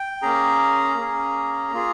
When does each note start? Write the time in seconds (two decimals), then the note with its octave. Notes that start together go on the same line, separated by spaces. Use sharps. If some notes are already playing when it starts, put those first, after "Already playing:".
Already playing: G5
0.22 A#3 C#4 G#4 A#5
0.97 A#3 C#4 G#4
1.72 A#3 F4 G#4